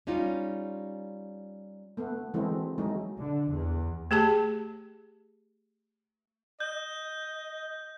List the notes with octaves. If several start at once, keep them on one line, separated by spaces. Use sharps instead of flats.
G3 C#4 D#4 F4
A3 B3
E3 G#3 A3 C4 E4 F#4
F#3 G#3 A3 D#4
D3
E2
A3 G4 G#4 A5
D#5 G6